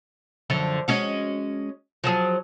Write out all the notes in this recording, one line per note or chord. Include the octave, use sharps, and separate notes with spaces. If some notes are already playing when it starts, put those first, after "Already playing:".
F#2 D3 F3
G#3 C#4 F#4
F3 F#3 G#4